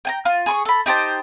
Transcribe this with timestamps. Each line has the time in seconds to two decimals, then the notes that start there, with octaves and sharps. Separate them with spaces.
0.05 G5 G#5 A#5
0.25 F4
0.46 G#4 C6 C#6
0.65 A4 B5
0.86 D#4 G4 C5 A5